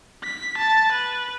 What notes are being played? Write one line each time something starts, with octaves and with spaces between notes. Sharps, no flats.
B6
A5
B4